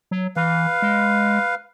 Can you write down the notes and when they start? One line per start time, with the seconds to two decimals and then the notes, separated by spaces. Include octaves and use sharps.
0.11 F#3
0.36 E3 B4 F5
0.82 G#3